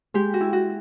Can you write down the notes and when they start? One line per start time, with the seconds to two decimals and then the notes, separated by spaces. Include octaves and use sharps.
0.14 G#3 G4
0.34 F#4
0.41 E4
0.53 F#4